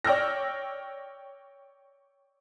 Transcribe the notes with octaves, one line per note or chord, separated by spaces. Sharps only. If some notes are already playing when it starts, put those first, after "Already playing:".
C#5 D5 G5 E6 F6 A#6